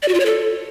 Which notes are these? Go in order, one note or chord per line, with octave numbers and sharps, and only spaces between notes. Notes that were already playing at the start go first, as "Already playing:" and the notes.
D5
F#4
F4
C#5
A4